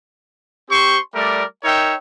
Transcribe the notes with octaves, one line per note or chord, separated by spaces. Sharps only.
C4 G4 C5 C6 C#6
G3 A3 A#4 D5
D#4 A#4 C#5 E5 G5